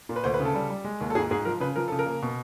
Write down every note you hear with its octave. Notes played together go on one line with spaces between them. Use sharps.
A#2
B4
D2 C5
B4
C#3
A4
G3
G3
G#3
D#2
A4
G#2 G#4
G#2 G#4
F3 A#4
C#3 B4
F3 A#4
C#3 A4
A#4
A#3
B2